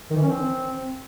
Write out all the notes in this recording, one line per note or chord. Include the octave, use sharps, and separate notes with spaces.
D#3
E3
C#4
C4